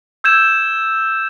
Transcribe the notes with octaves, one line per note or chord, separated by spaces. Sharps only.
E6 G6 G#6 E7